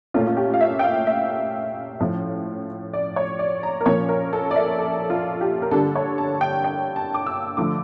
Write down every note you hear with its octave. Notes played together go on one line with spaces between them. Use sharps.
A#2 A3 C#4 F4
F4
G4
F5
E5
G5
F5
E5
A2 F3 C#4
D5
C#5
D5
A#5
A#4
A#2 F3 A#3 C#4 C#5
A#4
A4
D5
E5
A4
F4
G4
A#4
D3 G3 A#3 D4 A4
C#5
A5
G5
G5
A5
D6
E6
D3 F3 A3 D6